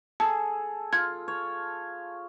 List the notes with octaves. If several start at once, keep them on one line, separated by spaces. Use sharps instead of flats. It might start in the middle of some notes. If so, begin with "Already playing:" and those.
G#4 A4 A5
F4 G#6
C#5